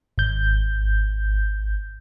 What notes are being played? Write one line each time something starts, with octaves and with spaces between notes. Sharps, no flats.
G#1 G6